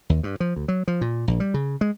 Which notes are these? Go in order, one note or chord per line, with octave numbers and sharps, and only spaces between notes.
D#2
G2
F3
D2
F#3
F3
A#2
A#1
G3
C#3
G#3